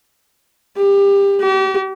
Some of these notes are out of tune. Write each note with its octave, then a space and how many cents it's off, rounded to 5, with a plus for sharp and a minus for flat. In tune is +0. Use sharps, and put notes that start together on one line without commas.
G4 +25
G4 -40